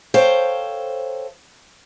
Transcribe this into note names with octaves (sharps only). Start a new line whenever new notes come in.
A4 C5 C#5 F5 G5